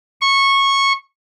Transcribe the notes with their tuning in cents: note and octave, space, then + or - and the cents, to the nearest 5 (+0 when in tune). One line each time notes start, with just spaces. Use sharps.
C#6 -15